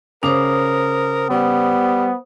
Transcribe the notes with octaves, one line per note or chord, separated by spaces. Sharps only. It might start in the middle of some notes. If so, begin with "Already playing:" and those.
C#3 A#4 C5 D6 D#6 F7
G3 B3